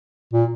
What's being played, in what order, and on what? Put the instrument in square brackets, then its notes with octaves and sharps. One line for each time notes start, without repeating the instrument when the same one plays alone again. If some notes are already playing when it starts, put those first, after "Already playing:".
[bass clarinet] A#2